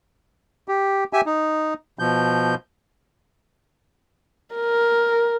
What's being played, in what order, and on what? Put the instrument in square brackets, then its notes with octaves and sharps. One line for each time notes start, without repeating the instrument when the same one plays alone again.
[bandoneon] G4
G4 E5 G#5
D#4
B2 F3 G6
[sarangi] A#4